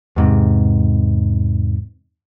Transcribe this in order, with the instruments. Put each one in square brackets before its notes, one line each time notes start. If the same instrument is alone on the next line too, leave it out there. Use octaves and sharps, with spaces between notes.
[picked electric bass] E2 G#2 C3